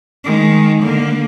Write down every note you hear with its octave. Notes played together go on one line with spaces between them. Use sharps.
D#3 G#3
D3 A#3